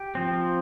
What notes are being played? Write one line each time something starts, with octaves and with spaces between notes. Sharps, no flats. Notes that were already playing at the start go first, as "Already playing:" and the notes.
Already playing: G4
F3 C4